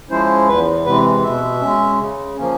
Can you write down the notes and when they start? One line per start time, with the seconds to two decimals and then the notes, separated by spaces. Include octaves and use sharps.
0.10 F3 G#3 C#4 E4 C5
0.48 E2 B4
0.86 C3 E3 G#3 B4
1.23 B2 E5
1.61 G#3 C#4
1.99 C#3
2.37 F3 A#3 C#4